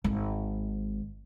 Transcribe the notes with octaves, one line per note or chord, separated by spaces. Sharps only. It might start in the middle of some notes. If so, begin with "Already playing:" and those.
G#1